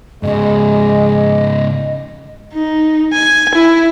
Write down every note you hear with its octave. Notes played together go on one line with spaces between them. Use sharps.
G#2 C#3 G#3 D#5
D#4
G#5
E4